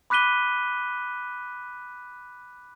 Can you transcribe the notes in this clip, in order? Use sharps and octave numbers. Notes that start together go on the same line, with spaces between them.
B5 D6 F#6 B6 D#7 G7